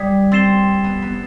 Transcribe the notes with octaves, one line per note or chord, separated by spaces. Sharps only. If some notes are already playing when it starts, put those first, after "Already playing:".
Already playing: G3 D#6 G#6 B6
C4 E6 A6 C7 E7 G7
B3
B3